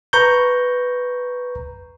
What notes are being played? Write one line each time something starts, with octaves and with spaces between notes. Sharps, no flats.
B4 A#5 C#6 G6